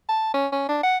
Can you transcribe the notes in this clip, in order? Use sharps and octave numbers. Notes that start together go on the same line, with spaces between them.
A5
C#4
C#4
D4
F#5